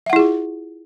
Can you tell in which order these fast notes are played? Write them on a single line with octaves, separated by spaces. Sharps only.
E5 F#5 E4 G#4 F4